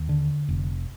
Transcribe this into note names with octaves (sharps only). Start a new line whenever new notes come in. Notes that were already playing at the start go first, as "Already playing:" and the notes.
Already playing: D#2
D3
F1